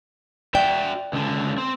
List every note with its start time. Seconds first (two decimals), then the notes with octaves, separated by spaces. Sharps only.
0.55 F#4 D5 E5 G5
1.13 C#2 D3
1.58 C4